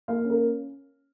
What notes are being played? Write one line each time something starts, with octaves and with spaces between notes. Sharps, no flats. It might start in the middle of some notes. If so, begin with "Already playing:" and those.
A#3 F5
C#4
A#4